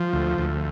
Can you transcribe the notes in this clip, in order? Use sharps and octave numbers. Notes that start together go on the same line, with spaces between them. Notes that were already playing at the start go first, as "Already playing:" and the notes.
Already playing: F3
D2
D2